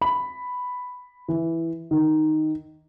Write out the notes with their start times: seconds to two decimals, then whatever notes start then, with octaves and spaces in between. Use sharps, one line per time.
0.01 B5
1.28 E3
1.91 D#3